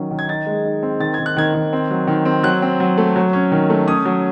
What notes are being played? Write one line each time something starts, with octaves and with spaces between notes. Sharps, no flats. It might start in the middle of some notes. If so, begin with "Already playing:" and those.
Already playing: D#3 F#3 C#4
D#3
G#6
D#4 A6
G#3
D#4
C4
D#3 A6
D#3 G#6
F#6
D#3 G#6
D#3
C4
F#3
D#3
C4
F#3 F#6
C4
F#3
A3
F#3
C#4
D#3
A3
C#4 D#6
F#3